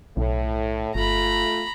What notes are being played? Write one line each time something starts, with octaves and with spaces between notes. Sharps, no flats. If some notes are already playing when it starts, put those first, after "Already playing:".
B1 A2
G1 A3 F4 A#5 B5